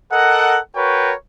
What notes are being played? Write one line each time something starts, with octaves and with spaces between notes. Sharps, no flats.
A4 A#4 D#5 F#5
F#4 A#4 B4 C#5 G5